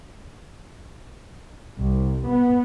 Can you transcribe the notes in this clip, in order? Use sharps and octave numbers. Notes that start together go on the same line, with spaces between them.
C2
B3